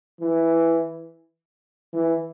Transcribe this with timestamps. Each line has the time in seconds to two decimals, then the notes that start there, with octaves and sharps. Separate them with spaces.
0.21 E3
1.93 E3